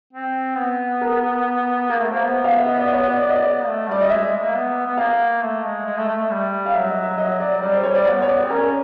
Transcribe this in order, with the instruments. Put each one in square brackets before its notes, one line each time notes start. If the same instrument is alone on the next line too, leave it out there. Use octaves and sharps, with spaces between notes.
[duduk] C4
B3
[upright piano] A#4
[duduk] A#3 [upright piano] A#4
[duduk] A3
[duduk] A#3 [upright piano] C5
[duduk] B3
[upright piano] F5
E5
D#5
D5
C#5
D5
[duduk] B3 [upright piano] D5
[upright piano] D#5
D5
[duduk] A3
[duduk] G3 [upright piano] D5
[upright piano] D#5
[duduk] G#3 [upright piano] E5
[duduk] G#3
G#3
A#3
B3
B3
[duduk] A#3 [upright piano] F5
[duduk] A3
G#3
G#3
A3
A3
A3
G3
[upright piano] F5
[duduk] F#3 [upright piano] E5
[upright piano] D#5
E5
[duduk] F#3 [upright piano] D#5
[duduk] F#3 [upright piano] D5
[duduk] G3 [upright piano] D5
[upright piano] C5
[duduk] G3 [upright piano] C#5
[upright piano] D5
[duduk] B3 [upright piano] C#5
[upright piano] C#5
D5
[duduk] C4
[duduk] C#4 [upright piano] A#4